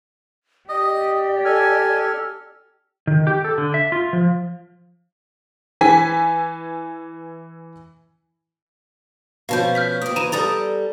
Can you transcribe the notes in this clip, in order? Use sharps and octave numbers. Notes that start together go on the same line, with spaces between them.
G4 D5 D#5
A4 G#5 F6
D#3
G4
A4
D3
E5
F4
F3
E3 G#5 B6
B2 F3 C#4 F5 A5 G6
F6 G6 B6
A#3 C4 D#6
E3 D#5 A#5 D#7 E7
G3 A4 A#5 D#6 A6 F7